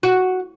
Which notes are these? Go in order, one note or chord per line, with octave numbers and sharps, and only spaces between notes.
F#4